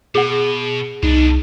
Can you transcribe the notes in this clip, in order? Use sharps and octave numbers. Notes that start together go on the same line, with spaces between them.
B2 G#4 F#5
C2 B2 D4 D#4